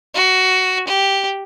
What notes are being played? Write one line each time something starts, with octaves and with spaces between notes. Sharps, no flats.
F#4
G4